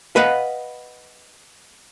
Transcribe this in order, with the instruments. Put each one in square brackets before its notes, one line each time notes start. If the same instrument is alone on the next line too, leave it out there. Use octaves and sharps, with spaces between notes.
[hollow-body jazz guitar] B4 D#5 F5 F#5